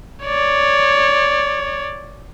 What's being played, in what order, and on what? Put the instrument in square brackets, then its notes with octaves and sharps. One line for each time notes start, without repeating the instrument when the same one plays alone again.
[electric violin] C#5 D5